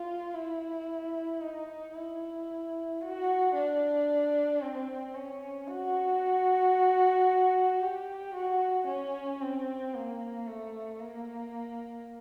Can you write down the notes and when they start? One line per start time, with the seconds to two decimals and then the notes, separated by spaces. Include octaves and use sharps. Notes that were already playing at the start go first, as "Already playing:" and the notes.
Already playing: F4
0.35 E4
1.41 D#4
1.95 E4
3.01 F#4
3.54 D4
4.62 C4
5.14 C#4
5.68 F#4
7.80 G4
8.34 F#4
8.87 C#4
9.41 C4
9.94 A#3
10.47 A3
11.00 A#3